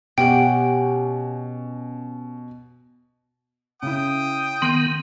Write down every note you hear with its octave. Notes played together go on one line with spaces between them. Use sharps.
B2 C#4 G4 F#5 G5
C#3 E4 G5 D#6
D#3 B3 C6 G6